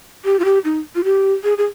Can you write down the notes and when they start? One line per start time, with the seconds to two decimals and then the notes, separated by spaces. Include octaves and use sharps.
0.25 G4
0.39 F4
0.45 G4
0.65 D#4
0.95 F4
1.04 G4
1.44 G#4
1.58 G#4